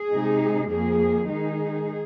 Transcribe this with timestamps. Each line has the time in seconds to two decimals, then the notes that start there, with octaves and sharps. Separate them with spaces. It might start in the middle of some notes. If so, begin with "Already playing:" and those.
Already playing: G#4
0.11 C3 G#3 D#4
0.68 F2 F3 A#3 G#4
1.28 D#3 G#3 D#4 G#4